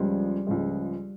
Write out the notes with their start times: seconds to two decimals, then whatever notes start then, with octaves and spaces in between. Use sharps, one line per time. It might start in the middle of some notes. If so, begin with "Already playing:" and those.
Already playing: C#2 C#3 F3 G3 G#3
0.47 C#2 C#3 F3 G#3